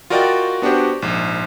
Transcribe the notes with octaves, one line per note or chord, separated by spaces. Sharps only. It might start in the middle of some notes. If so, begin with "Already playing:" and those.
F4 F#4 A#4 D5 D#5 G5
B3 D4 F#4 G4 C5
A#1 G#2